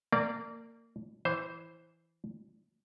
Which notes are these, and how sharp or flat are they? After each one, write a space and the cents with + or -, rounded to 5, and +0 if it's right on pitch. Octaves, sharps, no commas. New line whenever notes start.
A#3 -25 D5 +0
E3 +0 C5 +0